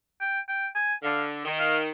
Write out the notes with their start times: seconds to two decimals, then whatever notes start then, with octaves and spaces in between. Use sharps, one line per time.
0.21 G5
0.48 G5
0.75 G#5
1.03 D3 F5
1.45 D#3
1.59 F5